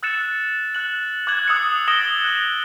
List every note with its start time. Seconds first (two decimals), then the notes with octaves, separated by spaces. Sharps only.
0.03 E6 F#6 A6 C#7 E7
0.75 F#6 F#7
1.27 D6 F#6 G#6 F#7
1.48 D#6 E6 F#6 C#7
1.88 D#6 A6 A#6 D7 E7 G7
2.24 F#6 E7 F#7